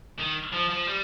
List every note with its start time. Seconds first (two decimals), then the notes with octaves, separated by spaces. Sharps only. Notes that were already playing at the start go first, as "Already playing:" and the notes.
0.20 D#3
0.53 F3
0.70 F3
0.87 G3